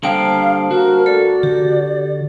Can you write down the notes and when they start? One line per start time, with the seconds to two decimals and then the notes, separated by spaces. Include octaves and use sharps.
0.03 D3 G3 A#3 C5 F5 G5 A5
0.71 F#4 A#4
1.06 A3 A4 D5
1.43 D3 G4